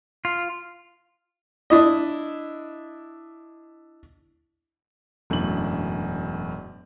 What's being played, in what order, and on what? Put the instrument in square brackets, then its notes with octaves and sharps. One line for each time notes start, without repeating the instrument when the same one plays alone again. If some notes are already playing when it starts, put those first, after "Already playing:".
[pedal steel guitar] F4
[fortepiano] D4 E4 D#5
[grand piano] E1 F#2 A2 D4 F#7